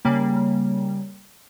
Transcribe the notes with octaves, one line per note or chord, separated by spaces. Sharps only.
C#3 G3 A#3